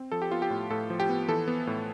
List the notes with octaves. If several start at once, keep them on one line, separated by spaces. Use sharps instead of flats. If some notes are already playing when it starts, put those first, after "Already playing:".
Already playing: C4
F3 A4
G4
B3 F4
G4
A2
A2 A4
F3
G4
B3
E3 A4
B3
A2